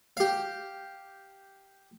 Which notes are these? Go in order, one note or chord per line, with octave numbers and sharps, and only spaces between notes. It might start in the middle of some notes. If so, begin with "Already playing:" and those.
G4 F5